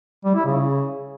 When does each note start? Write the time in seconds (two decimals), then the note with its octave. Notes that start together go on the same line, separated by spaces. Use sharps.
0.25 G3
0.35 E4
0.46 C#3